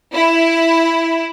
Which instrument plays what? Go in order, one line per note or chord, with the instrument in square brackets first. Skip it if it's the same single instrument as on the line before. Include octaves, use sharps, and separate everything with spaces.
[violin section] E4